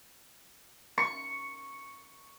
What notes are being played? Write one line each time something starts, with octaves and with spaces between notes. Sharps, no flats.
C#6